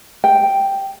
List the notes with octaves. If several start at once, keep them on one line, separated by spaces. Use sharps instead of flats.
G5